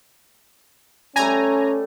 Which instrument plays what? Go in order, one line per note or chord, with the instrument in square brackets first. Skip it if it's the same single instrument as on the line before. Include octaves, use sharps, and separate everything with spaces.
[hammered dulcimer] G3 A3 [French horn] C#4 [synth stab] G#5 A#5